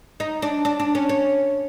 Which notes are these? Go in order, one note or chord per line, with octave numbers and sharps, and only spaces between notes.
D#4
D4
D4
D4
C#4
C#4